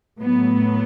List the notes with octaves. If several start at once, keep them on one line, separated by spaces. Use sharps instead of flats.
A2 F#3 B3